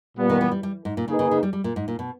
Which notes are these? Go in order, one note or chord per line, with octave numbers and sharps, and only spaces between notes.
A#2 G3 B3
D#3
E3
G3
G3
G#2
A#2
C#3 A#3 D#4 G#4 B4
C#3
C#3
G3
G3
A#2
G#2
A#2
B2